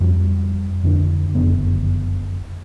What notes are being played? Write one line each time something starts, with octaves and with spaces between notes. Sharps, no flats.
F2 F3 G3
F2 D3 D4
F#1 F2 D3 B3